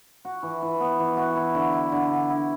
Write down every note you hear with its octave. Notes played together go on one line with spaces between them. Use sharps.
F#4
E3
E3
B3
E3
F#4
E4
D3
E4
D3
D3
E4